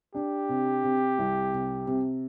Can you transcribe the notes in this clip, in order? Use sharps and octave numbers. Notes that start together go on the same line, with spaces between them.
D4 G4
C3
C3
C2
C3
C3